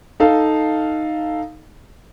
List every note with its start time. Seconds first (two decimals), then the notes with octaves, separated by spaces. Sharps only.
0.20 D#4 A4 F5